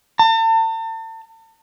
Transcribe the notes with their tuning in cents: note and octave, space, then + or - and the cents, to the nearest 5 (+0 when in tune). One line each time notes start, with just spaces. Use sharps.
A5 +40